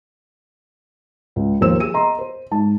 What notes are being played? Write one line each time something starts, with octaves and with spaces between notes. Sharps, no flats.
C#2
D#2 F3 A#3 C5 E6 E7
G#4 E6 D#7
D#5 A#5 C6
C5
G#2 A5